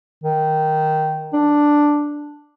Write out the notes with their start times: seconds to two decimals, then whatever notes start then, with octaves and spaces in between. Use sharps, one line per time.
0.24 D#3
1.33 D4